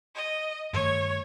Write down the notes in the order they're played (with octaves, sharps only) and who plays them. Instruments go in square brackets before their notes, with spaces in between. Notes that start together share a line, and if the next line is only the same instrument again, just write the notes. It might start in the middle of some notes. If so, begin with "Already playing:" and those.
[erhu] D#5
[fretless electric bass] G2 D#3 A3 [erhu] C#5